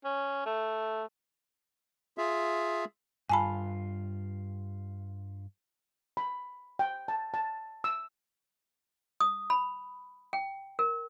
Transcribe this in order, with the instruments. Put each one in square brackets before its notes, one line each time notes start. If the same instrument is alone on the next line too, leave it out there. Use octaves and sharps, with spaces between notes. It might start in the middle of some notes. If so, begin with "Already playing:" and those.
[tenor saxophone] C#4
A3
[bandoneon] F4 G#4 E5
[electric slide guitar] G2 F4 [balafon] G#5 A5 B5
[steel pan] B5
G5
A5
A5
E6
[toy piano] D#6
B5
G5
A#4